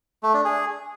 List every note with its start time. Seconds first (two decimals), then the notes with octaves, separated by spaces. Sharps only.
0.23 A3
0.34 D4
0.45 G#4